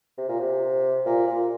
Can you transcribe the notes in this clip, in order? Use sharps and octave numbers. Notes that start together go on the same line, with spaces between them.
C3
A#2
C3
A#2
A#2